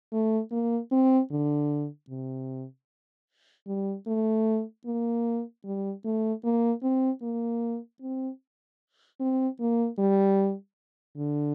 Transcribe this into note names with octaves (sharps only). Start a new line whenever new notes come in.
A3
A#3
C4
D3
C3
G3
A3
A#3
G3
A3
A#3
C4
A#3
C4
C4
A#3
G3
D3